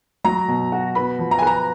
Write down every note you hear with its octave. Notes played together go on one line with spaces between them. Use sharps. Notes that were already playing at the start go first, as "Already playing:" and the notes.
F#3 A#5
B2
F#4
B3 B5
F3
A#5
G#5
B4 A#5